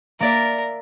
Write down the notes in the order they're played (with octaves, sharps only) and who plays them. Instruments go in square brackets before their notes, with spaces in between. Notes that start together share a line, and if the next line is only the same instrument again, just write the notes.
[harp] A#3 D5 E5 [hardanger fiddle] A#4